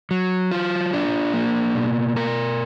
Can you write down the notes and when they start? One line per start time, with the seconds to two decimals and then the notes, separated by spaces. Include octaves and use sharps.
0.11 F#3
0.51 F4
0.93 D4
1.33 A#3
1.75 B2
2.16 A#4